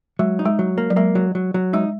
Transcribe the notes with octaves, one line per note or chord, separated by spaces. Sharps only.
F#3 G#3
D#4
G#3
F#3
A#3
F#3
G#3 A#3
F#3
F#3
F#3
G#3 D#4